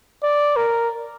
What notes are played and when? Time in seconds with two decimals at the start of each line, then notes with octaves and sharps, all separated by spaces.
0.23 D5
0.56 A#4